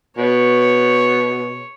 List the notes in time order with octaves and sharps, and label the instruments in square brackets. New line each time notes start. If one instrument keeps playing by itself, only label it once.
[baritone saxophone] B2 [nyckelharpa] C#5